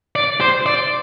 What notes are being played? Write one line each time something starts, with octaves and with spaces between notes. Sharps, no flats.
D5
C5
D5